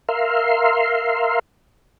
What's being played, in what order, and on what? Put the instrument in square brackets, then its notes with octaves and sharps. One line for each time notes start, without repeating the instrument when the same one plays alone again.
[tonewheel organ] A#4 E5 F5 C6